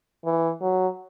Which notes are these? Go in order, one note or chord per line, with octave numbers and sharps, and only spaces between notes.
E3
F#3